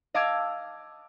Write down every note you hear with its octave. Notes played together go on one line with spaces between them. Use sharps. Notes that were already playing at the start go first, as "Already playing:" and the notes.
D#5 F5 A5 D6 E6 G#6